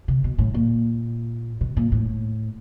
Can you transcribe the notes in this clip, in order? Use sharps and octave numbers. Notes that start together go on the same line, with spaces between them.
C3
B2
A2
A#2
B2
A#2
A2